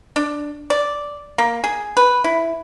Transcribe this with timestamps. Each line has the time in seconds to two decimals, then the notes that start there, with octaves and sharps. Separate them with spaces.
0.16 D4
0.70 D5
1.38 A#3
1.64 G#4
1.97 B4
2.24 E4